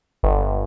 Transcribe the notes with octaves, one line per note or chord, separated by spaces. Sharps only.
G1